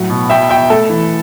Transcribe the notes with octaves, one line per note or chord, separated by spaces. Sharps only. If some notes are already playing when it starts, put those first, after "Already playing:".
Already playing: A2 F#3 F#5
B2
B2 E5 G5
B2 E5 G5
A3 A4
E3